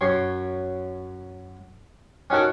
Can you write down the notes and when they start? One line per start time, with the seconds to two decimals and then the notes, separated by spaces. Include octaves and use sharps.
0.01 F#2 C#5 C6
2.30 C#4 D#4 F#4 A4 A#4